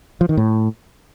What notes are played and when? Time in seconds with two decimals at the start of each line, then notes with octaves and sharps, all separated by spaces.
0.21 F3
0.29 D#3
0.37 A2